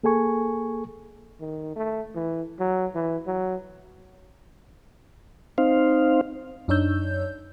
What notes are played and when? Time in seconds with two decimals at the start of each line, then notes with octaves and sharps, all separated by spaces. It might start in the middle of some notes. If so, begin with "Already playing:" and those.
0.04 A#3 G#4 A4 G#5 C#6
1.41 D#3
1.76 A3
2.16 E3
2.60 F#3
2.95 E3
3.27 F#3
5.58 C4 D#4 C5 F5
6.68 F#2 D4 D#4 C#5 E6 G6